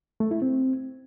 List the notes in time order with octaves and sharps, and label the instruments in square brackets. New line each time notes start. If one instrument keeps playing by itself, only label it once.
[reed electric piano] A3
E4
C4